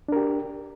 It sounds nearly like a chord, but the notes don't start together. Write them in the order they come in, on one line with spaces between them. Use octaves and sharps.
D4 A#4 G4